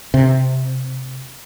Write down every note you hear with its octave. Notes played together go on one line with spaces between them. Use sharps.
C3